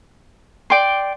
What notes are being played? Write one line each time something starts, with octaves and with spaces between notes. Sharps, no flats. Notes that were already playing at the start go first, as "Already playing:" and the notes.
D5 G5 C6